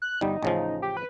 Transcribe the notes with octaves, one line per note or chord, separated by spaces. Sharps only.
F#6
G1 G3 D#4
A1 C#3 F3
G4
B4